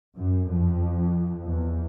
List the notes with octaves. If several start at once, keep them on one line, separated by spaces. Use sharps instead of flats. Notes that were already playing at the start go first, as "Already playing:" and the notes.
F#2
F2
E2